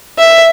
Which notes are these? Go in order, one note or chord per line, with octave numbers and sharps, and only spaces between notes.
E5